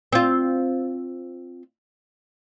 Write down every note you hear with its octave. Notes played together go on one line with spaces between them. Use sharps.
C4 F4